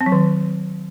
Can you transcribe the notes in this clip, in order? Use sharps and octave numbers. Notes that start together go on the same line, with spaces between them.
C4
F#3
D#3